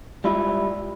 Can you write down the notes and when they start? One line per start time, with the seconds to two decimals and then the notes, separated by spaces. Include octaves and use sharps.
0.24 G3 G#3 E4 F4 E5